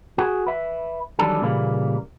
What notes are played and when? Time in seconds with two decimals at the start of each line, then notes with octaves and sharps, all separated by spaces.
0.18 F#4 G#4
0.47 B4 E5
1.19 D#3 E3 F#3 G3 D4 A4
1.42 A#2 C#3 E3 G3 A#3